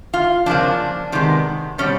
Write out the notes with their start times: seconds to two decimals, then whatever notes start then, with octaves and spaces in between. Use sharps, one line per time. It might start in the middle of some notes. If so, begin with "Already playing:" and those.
0.14 F4
0.46 F2 C#3 F3 A#3 D4
1.12 C3 D#3 G#3 B3
1.78 B2 G3 C4 C#4